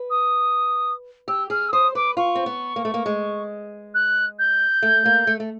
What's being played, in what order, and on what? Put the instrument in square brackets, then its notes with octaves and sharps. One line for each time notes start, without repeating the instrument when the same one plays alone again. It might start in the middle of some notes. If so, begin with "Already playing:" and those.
Already playing: [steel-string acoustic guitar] B4
[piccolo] D#6
[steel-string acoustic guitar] G4 [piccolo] E6
[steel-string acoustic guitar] G#4 [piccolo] F6
[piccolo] E6
[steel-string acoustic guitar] C5 [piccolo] D#6
[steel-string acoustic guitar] B4 [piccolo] D6
[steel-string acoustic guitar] F4 [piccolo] C#6
[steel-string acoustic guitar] C4
B3
A#3
A3
A#3
G#3
[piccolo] F#6
G6
[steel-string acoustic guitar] A3
A#3
A3
A3